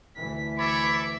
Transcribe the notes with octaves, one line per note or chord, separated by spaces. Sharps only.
D2 E3 B6
A4 C#5 E5 B5 D6